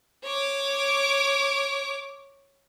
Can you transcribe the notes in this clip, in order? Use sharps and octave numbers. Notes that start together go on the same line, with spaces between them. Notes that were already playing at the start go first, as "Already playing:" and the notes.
C#5 D6